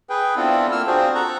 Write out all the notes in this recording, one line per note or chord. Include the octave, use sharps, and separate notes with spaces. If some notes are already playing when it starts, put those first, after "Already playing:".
G#4 B4 G5
B3 C4 D4 E4 F4 A4
A#3 E6 F6
C4 D4 F4 F#4 G#4 C5
A4 F#5 A#5 C#6